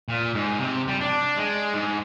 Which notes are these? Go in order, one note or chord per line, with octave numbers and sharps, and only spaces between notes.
A#2
G#2
C3
G3
D4
G#3
G#2